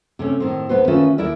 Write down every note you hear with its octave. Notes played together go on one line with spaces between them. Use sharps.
C3 A3 C#4
A2 D#3 C4
D2 A#2 B3 B4 C5
D#3 A3 C#4 F4 B4 E5
D#2 E4 A#4 D5 E5